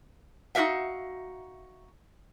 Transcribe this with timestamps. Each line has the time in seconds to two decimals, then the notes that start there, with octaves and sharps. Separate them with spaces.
0.55 D#4 F#4 G4 A#4 E5 F5